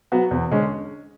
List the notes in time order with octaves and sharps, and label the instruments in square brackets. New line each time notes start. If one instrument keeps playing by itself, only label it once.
[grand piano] F#3 B3 F#4
E2
D3 G#3 C#4